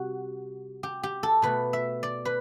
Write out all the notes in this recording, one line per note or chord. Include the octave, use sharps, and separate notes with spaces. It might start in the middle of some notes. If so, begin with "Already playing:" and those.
Already playing: C3 G3 F#4
G4
G4
A4
B2 A3 B4
E5
D5
B4